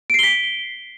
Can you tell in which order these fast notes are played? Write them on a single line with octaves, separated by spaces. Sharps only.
D7 C7 G7 B6